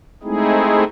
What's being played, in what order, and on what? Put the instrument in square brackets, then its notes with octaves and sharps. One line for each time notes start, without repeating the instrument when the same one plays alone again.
[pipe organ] G#3 A3 C4 D#4 E4 G#4